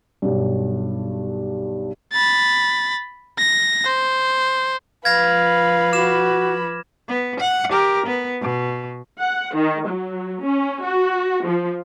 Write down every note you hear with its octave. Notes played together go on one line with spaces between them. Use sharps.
B1 G2
B5 A6
A#6
C5
F3 B4 F5 B5 G#6 A#6
F#4 D6 F6 E7
B3
F#5
G4 A#4
B3
B2
F#5
D#3
F#3
C#4
F#4
F3